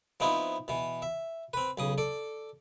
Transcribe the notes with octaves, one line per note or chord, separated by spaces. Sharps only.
F3 B3 C4 D#4 E4
B2 E3
E5
C4 B4
B1 C#3 D#6
A4 D5